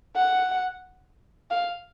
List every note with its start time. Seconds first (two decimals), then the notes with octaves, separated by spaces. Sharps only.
0.16 F#5
1.51 F5